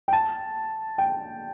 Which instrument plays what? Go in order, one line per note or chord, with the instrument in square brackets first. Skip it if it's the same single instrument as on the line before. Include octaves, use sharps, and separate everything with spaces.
[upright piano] G5
A5
G5